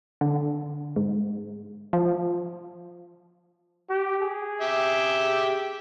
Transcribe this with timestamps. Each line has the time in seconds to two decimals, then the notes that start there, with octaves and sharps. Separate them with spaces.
0.21 D3
0.96 G#2
1.93 F3
3.90 G4
4.22 G#4
4.61 G4 E5